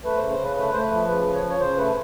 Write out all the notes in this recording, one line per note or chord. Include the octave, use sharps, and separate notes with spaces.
A3 B4
C5
C#3
C5
C#3 B4
A3 B4
A3 C5
B4
F3
C#3 B4
F3
C#5
C#3
C#5
C#3 C5
A3 B4